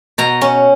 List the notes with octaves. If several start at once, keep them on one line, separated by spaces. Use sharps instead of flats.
B2 A#5
C#4